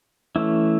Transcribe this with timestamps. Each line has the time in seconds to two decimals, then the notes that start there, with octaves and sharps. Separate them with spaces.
0.36 E3 A3 C#4 E4